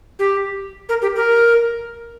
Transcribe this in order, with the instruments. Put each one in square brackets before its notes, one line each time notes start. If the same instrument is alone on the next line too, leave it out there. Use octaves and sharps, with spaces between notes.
[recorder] G4
A#4
G4
A#4